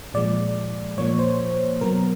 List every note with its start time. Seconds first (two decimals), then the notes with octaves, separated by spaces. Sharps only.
0.14 A#2 F3 G#3 D5
0.98 A#2 F3 A#3 C#5
1.19 C5
1.81 B2 F#3 B3 A#4